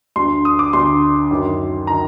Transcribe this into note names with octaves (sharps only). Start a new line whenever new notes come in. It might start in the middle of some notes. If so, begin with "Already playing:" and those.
D2 D3 C6
D#6
D6
D2 D3 C6
F#2 D#3
D#3 A#5